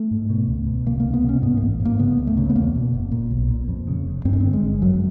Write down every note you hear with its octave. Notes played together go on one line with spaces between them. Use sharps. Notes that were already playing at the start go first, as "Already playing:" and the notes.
Already playing: A3
G#2
B2
C#2
B2
C3 A#3
A#3
C#2
B3
C3
C#4
G#2 B3
A1 A#3
G#2
A#3
C#3 B3
C#2
A3
C#3
B3
E2 A#3
B2
F#1
A#2
B1
A#2
F2
C#3
F1
G2 C4
C#4
D3 C4
G#3
G#1
F#2 F#3